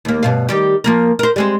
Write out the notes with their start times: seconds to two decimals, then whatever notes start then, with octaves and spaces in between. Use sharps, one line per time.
0.05 D#2 A#3
0.23 G2 B2 F5
0.49 D#3 G3 G4
0.84 F3 A#3 A#4
1.19 A#4 C5
1.36 G3 G#3 C4